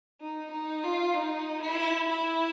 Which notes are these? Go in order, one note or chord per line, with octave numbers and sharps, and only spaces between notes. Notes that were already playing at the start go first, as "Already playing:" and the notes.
D#4
D#4
F4
D#4
E4
E4